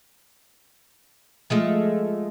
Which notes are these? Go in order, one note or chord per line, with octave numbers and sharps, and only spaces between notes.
F3 G#3 A3